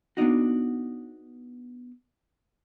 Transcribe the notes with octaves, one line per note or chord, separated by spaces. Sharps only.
A#3 B3 D4 D#4 F#4